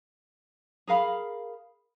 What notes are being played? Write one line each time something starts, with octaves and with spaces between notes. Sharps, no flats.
G#4 A#4 F5 B5